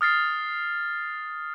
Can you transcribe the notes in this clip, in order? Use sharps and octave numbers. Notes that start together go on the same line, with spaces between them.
D#6 F6 A6 C7